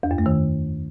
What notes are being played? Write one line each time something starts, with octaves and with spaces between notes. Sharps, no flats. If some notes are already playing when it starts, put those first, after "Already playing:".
E2
F#2
A3
D#3